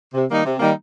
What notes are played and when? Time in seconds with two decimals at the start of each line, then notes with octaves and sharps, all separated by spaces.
0.13 C3
0.29 D#3 G3 A#3 D#4
0.44 C3
0.59 D#3 G3 A#3 D#4